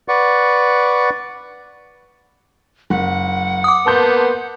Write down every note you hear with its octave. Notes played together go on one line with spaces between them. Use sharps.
B4 D5 F#5 C#6
F#1 F#5
D6 D#6
A#3 B3 A5 C6 G6